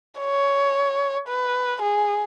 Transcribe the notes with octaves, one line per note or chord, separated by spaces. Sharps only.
C#5
B4
G#4